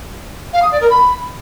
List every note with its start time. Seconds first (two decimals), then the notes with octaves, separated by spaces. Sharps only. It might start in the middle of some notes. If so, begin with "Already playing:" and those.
0.53 F5
0.62 D#6
0.72 D5
0.81 A#4
0.90 B5